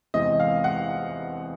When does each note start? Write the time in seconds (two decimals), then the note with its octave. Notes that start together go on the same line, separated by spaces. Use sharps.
0.14 E2 C3 E3 G#3 C4 D#5
0.40 F5
0.64 F#5